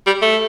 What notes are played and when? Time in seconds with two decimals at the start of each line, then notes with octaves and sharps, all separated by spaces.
0.07 G3
0.22 A3